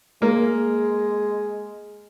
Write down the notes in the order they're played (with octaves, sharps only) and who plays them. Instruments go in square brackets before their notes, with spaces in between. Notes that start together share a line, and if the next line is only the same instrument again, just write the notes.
[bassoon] G#3 [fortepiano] A#3